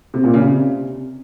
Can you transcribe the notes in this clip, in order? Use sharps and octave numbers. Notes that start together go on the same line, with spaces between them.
C3
A#2
C#3
C3